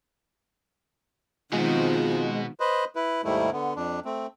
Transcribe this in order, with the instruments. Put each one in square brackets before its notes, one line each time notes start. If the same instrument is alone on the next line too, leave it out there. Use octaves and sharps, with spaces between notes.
[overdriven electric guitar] B2 F#4 [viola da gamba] D#3 F3 C4 [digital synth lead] G#3 [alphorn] F4
[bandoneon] B4 C5 D#5
E4 B4
D#2 G#2 D#3 G3 A3 E4
D3 B3
F2 D4
A3 C4